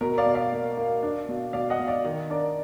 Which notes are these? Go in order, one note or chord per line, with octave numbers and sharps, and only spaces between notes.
B2 A#4
D5 F5
B2
D5 F5
A#3
A#3
D4
B2
B2 D5 F5
D#5 F#5
B2
D5 F5
D#3
D4 A#4 D5